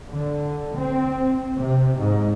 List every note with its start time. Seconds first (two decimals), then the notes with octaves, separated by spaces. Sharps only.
0.12 D3
0.76 C4
1.57 C3
1.99 G#2